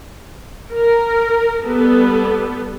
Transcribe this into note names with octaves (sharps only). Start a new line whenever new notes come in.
A#4
G3 B3 A4